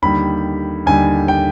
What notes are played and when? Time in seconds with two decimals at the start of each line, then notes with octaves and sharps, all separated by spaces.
0.02 D#2 D3 G3 B5
0.86 D#2 D3 G3 G#5
1.28 G5